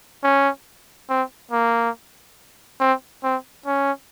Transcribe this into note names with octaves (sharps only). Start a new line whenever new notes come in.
C#4
C4
A#3
C4
C4
C#4